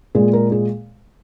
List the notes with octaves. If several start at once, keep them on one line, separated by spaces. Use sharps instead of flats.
A#2 G#3 G#4
A#4
G#4